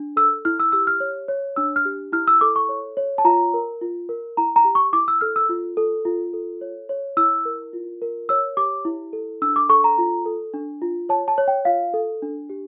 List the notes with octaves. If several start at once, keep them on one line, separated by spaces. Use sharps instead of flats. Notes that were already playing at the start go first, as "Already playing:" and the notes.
Already playing: D4
A4 E6
E4 F6
E6
G4 E6
F6
C#5
C#5
D4 E6
F6
G4
E4 F6
E6
A4 D6
C#6
C#5
C#5
A5
F4 A#5
A#4
F4
A#4
E4 A#5
A#5
G4
C#6
E4 D6
E6
A4 F6
E6
F4
A4
F4
A4
C#5
C#5
E4 E6
A#4
F4
A#4
C#5 E6
G4 D6
E4
A4
D4 E6
D6
A4 C#6
A#5
F4
A4
D4
F4
C#5 A5
A5
C#5
G5
F4 F5
A4
D4
G4